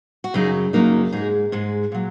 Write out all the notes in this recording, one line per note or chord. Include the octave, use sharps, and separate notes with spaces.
F#4
F#2 C#3 F#3 D#4 G#4
F#2 C#3 F#3 A#3 D#4
G#2 G#3 D#4 G#4
G#2 G#3
A#2 F#3